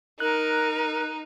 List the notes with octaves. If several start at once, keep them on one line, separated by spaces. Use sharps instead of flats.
D#4 A#4 F#6